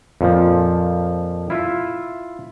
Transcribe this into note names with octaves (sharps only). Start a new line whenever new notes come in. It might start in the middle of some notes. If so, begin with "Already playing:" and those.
F2 A#2 F3
E4 F4 E5